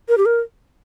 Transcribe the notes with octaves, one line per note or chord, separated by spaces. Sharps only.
A#4
G4
A#4